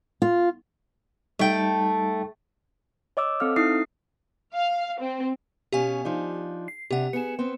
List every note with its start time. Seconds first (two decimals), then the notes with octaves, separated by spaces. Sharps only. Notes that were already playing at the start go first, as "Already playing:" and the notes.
0.22 F4
1.39 G3 A3 D#4 G5
3.17 C#5 D#5 D6 E6
3.40 C4 A4 F5 F6
3.56 D#4 E4 D#6 C7
4.53 F5
4.99 C4
5.72 B2 C#4 G4 F5 G#5
6.05 F3 D4 D#4
6.68 C7
6.91 C3 D4 G4 F#5
7.13 B3 G#4 C#7 E7
7.39 B3 C4